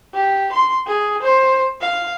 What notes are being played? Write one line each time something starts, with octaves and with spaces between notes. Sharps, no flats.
G4
C6
G#4
C5
F5